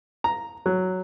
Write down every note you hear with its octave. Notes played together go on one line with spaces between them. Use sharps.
A#5
F#3